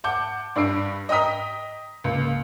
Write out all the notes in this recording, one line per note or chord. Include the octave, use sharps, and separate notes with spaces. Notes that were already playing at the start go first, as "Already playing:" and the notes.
F#5 A5 D6 G6
G2 D4 E6 C7 D7
D#5 G5 A#5 D#6 B6
C#2 A#3